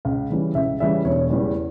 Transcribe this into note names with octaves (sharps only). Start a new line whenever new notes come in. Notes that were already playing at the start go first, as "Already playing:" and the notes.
C#2 F5
C#3 E3 G3
C#2 E5
C#3 E3 G3 E5
E1 C#5
E2 C#3 E3 G3